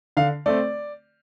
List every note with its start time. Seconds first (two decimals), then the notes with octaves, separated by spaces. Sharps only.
0.17 D3 F5
0.46 A3 C4 D5